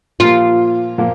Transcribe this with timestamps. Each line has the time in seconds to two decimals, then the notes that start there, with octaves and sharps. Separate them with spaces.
0.20 A#2 F3 A#3 F4
0.98 A#2 F3 A#3